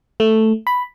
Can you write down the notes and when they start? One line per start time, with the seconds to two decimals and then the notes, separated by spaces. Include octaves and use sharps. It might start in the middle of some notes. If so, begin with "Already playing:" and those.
0.20 A3
0.67 B5